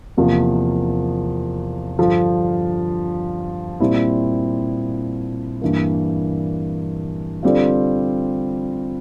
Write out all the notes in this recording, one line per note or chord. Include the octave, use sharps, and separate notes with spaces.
E2 C3 F3 A#3
G2 D3 F3
A#2 G3 C4 E4
G2 E3 A#3
D3 G3 C4 F4